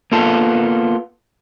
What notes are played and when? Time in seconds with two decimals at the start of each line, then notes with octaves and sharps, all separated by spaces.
0.12 A#3 B3 F4 A4